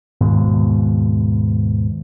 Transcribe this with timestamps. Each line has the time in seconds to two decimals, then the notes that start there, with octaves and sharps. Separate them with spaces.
0.21 D#2 G#2 B2